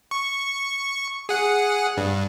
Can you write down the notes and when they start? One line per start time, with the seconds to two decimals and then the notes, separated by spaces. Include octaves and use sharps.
0.11 C#6
1.29 G#4 F#5
1.97 G2